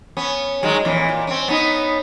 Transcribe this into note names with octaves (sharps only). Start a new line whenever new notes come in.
B3 C#4
D#3 F#3 G#3
F2 A#2 E3
A#2
C4 C#4
B3 C#4 D#4